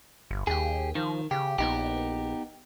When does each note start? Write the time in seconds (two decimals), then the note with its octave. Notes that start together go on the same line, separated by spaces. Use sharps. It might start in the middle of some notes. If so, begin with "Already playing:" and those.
0.31 G1
0.47 D#2 G4 G#4
0.95 D#3 F3
1.31 C#3 G4
1.59 A#1 B3 D#4 G4